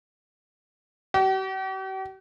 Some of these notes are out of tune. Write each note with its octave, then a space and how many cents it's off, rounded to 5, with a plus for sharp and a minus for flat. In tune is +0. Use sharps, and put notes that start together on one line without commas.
G4 -45